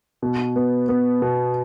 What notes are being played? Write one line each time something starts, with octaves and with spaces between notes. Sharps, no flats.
B2
B3
B3
B2